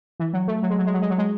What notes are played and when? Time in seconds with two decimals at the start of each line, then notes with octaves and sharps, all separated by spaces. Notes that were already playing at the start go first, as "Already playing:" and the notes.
0.20 E3
0.33 F#3
0.48 A3
0.63 F#3
0.70 G#3
0.79 F#3
0.86 G#3
0.94 F#3
1.02 G#3
1.10 F#3
1.18 G#3